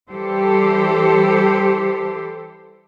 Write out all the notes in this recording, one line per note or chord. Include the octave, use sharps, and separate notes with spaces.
E3 G3 G4 A4 C5